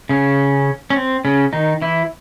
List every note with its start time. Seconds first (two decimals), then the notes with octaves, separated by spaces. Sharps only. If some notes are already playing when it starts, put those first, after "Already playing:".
0.09 C#3 C#4
0.90 C#4
0.96 C4
1.25 C#3 C#4
1.53 D#3 D#4
1.82 E3 E4